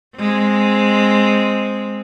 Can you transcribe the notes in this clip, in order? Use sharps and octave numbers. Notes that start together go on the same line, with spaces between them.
G#3 C4